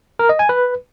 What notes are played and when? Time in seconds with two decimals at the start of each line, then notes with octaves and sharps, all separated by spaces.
0.19 A#4
0.29 D#5
0.39 G#5
0.49 B4